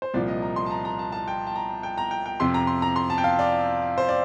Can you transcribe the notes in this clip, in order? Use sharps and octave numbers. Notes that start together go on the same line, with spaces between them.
C5
C2 A#2 F3 D5
D#5
A#5
C6
A5
A#5
A#5
A5
A5
G5
A5
A#5
G5
A#5
G5
G5
F2 C3 F3 C6
A#5
C6
A#5
C6
A5
G5
F5
D5
C5
D5